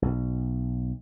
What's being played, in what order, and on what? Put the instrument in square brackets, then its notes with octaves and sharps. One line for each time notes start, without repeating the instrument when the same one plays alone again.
[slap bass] B1